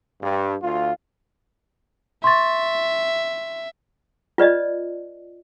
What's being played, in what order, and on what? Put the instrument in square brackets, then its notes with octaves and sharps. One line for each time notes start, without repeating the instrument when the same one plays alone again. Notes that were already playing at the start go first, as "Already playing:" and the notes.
[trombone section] G2
D2 F4
[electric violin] E5 [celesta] C6 C#6 A6
[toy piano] F4 B4 D5 D#5